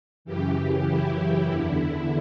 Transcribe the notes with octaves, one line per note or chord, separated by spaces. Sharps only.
F#2 C#3 E3 G4
E4
E2 D3